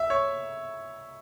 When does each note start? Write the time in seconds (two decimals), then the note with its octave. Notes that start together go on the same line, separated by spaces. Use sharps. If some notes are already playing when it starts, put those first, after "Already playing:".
Already playing: E5
0.10 C#5